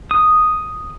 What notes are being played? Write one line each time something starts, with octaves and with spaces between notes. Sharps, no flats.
D#6